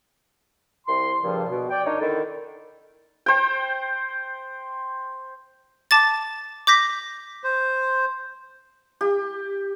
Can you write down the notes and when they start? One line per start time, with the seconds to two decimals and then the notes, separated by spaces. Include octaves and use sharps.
0.87 C2 C6
1.21 G2 A#2 C#3 F3
1.49 B2
1.70 D5 G5
1.85 D4 D#4 A#4 C#5
1.99 D3 D#3 E4 A4
3.26 C5 G5
5.91 A5 D6 A6
6.67 D6 G6 A#6 B6
7.44 C5
9.01 G4